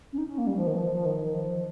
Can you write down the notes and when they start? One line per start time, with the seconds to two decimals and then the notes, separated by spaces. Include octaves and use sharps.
0.13 C#4
0.18 D#4
0.28 C#4
0.38 A#3
0.47 G3
0.57 F3
0.67 D#3
0.77 F3
0.92 F3
1.06 D#3
1.35 F3